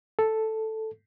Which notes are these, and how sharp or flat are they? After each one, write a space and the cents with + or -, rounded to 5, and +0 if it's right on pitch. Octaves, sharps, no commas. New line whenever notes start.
A4 +0